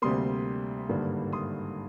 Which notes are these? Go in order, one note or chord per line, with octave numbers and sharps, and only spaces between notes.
D2 C3 G3 A#3 C6 D#6
G#1 G2 D3 G3 A#3
C6 D#6